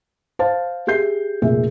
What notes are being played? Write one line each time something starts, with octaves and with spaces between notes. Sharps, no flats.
C5 F5 A5
G4 G#4 E5 G6 C7
F1 A#2 G#4 E5